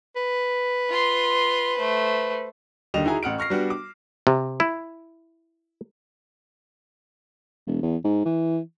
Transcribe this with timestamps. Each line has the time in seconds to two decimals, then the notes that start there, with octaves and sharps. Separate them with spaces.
0.16 B4
0.90 F4 C6
1.77 A3 C5
2.94 D#2 D3 G3 D#5 E7 F7
3.05 D#4 E4 F#4 G#4 G#5 A#5
3.23 A1 F#5 F6 D7
3.38 C#6 F6 A#6 C7
3.50 G3 B3 D4 F#4
3.70 D6
4.27 C3
4.60 E4
7.67 E1
7.83 E2
8.04 G#2
8.25 E3